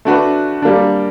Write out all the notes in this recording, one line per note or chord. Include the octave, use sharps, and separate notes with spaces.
A3 D4 F#4 B4
G3 A#3 D4